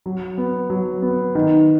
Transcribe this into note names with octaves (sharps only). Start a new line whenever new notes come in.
F#3
B3
F#3
B3
D#3